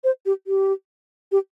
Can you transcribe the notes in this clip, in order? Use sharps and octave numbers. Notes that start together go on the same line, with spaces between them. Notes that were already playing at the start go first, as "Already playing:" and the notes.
C5
G4
G4
G4